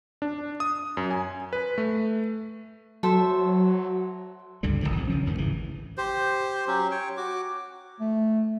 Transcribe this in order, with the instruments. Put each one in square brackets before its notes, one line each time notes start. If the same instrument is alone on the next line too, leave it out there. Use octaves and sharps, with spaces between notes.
[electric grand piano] D4
D#6
F#2
G#5
B4
A3
[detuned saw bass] F#3 [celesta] F#4 C6 [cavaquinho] A4 C5 E5
[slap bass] C#2 G2 D3 G3
D1 G1 D#3 F3
C2 F2 G#2
C#3 F3 C#4
A1 E2 G2 D#3
G#1 C#3 E3
[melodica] G4 C5
F#3 C#4 G4
C#5 G5
F#4 D6
[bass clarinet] A3